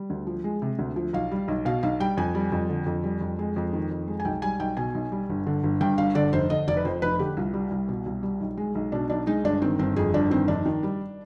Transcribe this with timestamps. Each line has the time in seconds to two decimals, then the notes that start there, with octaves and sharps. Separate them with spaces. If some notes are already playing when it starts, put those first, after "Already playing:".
Already playing: G3
0.10 D2
0.27 F3
0.44 G#3
0.62 C3
0.79 D2
0.96 F3
1.13 B1 F5
1.31 G3
1.48 B1
1.65 B2 F5
1.83 B1 F5
2.00 G3 G5
2.17 F2 G#5
2.35 G3
2.52 F2
2.69 D3
2.86 F2
3.04 G3
3.21 F2
3.39 G#3
3.56 F2
3.73 D#3
3.91 F2
4.08 G#3
4.20 G#5
4.25 B1 G5
4.42 G3 G#5
4.60 B1 G5
4.77 B2 G#5
4.94 B1
5.12 G3
5.29 G1
5.47 D3
5.63 G1
5.81 G2 G5
5.98 G1 F5
6.15 D3 D5
6.33 F1 C5
6.50 D3 D#5
6.68 F1 D5
6.77 B4
6.85 F2 C5
7.02 F1 B4
7.19 D3 G4
7.37 C2 F4
7.54 G3
7.71 C2
7.89 B2
8.06 C2
8.23 G3
8.40 B1
8.57 G#3
8.75 B1
8.92 B2 D4
9.10 B1 D4
9.27 G#3 D#4
9.44 G1 D4
9.62 D#3 C4
9.79 G1 C4
9.96 F2 G#4
10.14 G1 D4
10.30 D#3 C4
10.48 F1 D4
10.65 D#3
10.83 G3